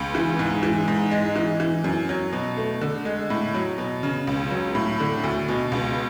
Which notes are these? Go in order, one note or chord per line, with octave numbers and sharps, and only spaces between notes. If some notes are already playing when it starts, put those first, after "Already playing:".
Already playing: C#2
E3
G#2
E3
G#2
G#3
E3
E3
F#2
F#3
B2
A3
D3
G#3
A2
F#3
B2
C#3
C#2
F#3
A2
D3
D2
B2
C#2